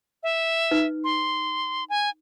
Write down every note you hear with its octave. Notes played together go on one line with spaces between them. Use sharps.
E5
D#4 B4
C6
G#5